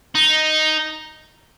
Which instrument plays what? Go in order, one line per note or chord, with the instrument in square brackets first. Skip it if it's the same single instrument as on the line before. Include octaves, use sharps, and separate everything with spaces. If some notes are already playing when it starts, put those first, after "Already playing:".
[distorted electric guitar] D#4